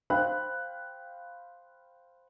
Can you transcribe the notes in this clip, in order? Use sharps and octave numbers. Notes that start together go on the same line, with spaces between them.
C5 F5 G5 B5 F#6